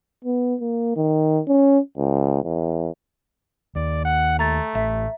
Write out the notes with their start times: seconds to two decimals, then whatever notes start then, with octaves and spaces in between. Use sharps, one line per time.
0.25 B3
0.61 A#3
0.96 D#3
1.48 C#4
1.97 C#2
2.44 E2
3.75 D#2 D5
4.05 F#5
4.39 A3 A#5 A6
4.75 A1 E5